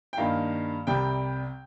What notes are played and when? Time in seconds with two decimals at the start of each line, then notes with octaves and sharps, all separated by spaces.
0.13 G5
0.17 G2 D#3 A#3 F5
0.87 C2 C3 G3 G5